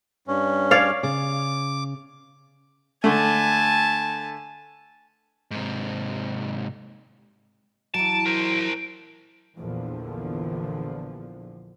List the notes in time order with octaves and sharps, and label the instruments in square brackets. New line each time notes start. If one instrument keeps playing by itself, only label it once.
[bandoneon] G2 C#4
[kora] C#5 D5 F5
[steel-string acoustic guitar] C#3 [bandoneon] D6
[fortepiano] D3 A3 [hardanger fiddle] G#5 A5
[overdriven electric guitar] G#2 C3
[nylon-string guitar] E3 F#3 [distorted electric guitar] A5 [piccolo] D7
[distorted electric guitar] A#4 C5
[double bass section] A#1 E2 D3 F3